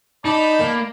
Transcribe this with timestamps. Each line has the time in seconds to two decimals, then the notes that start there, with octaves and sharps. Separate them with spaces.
0.25 D#4 D5 A5 B5
0.60 A#3